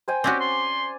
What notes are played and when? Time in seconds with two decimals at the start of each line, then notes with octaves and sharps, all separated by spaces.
0.08 C5 G5 G#5
0.24 C4 C#4 F#4 G4 D5 G#5
0.40 C6